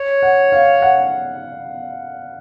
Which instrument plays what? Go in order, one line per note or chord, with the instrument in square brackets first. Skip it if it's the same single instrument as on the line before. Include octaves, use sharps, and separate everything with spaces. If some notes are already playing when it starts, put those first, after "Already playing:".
Already playing: [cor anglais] C#5
[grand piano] F#5
F5
F#5